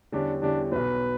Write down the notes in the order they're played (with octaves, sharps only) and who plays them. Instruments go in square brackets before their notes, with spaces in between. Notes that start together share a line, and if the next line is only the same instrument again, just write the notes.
[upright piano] E2 D3 G3 C#4 G4 [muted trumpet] D4
[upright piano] E2 D3 G3 C#4 G4 [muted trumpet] D4
[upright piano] B1 B2 F#3 [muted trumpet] B4